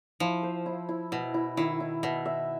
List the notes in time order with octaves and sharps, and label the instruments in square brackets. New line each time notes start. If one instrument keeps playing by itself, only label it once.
[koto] F3 [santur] E4
[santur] C5
E4
E4
[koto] B2 [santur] E4
[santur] E4
[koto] D#3 [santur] E4
[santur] E4
[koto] B2 [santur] E5
[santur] E5